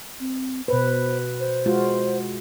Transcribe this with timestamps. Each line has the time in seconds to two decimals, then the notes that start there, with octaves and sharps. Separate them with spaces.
0.20 C4
0.68 B2 B4 C5
1.40 C5
1.66 G#3 F4 F#4